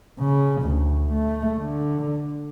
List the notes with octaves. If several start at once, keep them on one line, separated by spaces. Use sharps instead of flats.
C#3
D2
A3
D3